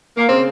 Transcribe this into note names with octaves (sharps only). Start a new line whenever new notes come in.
A#3
C#3 C4